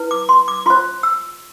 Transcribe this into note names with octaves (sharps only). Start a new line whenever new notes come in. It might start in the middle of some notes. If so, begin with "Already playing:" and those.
Already playing: E4 B4
D6
C6
D6
F4 C5 C6
E6